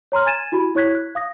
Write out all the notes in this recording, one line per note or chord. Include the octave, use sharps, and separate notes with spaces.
C#5 A#5 C6 F6
G#5 G#6 A6 D#7 E7
E4 F#4 G4 B5
E4 C#5 C#6 F#6 G#6 B6
F#6
F5 D#6 A#6